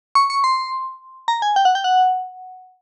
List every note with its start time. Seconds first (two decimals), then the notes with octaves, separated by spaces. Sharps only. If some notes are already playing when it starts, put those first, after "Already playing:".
0.15 C#6
0.30 C#6
0.44 C6
1.28 A#5
1.42 G#5
1.56 G5
1.65 F#5
1.75 G5
1.84 F#5